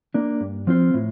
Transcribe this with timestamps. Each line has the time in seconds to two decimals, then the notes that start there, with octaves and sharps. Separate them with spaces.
0.14 A#3 D4
0.41 G2
0.67 F3 C4 F4 C5
0.94 A2